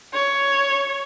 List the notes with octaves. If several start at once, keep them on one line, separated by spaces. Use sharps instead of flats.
C#5